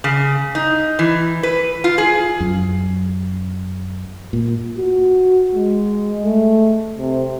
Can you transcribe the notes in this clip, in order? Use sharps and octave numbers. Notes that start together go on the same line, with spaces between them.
C#3
D#4
E3
B4
F4
G#4
F#2
A#2
F#4
G#3
A3
C3